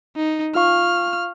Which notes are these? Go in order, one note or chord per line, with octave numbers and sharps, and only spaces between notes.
D#4
F4 F5 C#6 F6